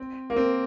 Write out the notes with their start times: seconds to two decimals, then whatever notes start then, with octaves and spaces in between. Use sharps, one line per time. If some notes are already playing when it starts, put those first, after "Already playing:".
Already playing: C4
0.30 A#3
0.36 C4